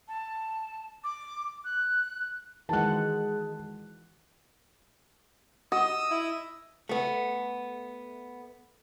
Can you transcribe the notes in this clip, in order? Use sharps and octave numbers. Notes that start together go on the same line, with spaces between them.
A5
D6
F#6
D#3 E3 G#3 F#4 G#4 F#5 A5 F#6
F#4 D#5 D#6 E6
E4
A3 B3